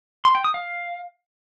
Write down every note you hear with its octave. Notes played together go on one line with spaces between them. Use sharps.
C6
G5
D#6
F5